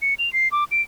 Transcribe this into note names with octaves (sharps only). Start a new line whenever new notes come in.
C#7
F7
C7
D6
D7